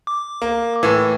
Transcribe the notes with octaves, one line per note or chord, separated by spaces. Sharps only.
D6
A#3
A2 E3